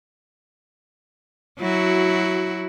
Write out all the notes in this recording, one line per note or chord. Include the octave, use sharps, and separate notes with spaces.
F#3 E4 F#4